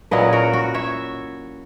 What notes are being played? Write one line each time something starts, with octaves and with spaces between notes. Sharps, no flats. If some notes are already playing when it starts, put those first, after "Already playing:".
A#2 F#3 C#4 E4 B4 D#5
F#4 A#4
F#4
C#5 E5